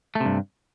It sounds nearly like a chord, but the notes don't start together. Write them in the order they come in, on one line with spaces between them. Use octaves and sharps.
A3 C3 G2